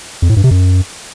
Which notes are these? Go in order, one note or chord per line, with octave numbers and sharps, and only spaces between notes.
F2
A2
G2
C3
F#2